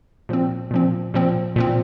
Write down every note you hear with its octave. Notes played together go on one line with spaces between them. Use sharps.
A#2 F3 C4
A#2 F3 C4
A#2 F3 C4
A#2 F3 C4